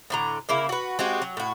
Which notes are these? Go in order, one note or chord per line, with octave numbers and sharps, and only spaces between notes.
A2 D3 A#5
C#3 A#3 E4
F#4 B4
G#3 C4 F#4 G4
F#3
A2 F#4